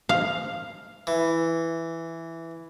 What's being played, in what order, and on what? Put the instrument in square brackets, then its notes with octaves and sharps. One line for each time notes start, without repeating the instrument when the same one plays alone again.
[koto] F5
[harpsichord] E3